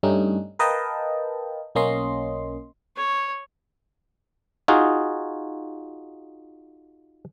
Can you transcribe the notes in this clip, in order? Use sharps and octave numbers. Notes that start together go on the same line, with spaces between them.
G2 G3 A3 C#4 D#4
A#4 B4 D#5 F5 G5 A5
B1 A#3 C#4 D#5 C6
C#5
D#4 F4 F#4 G#4